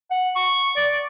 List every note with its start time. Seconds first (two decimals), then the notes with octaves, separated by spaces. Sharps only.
0.11 F#5
0.35 C#6
0.77 D5